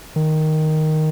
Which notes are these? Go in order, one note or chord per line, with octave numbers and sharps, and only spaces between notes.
D#3